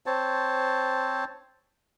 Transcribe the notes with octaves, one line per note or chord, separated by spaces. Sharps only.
C4 C5 C#5 A5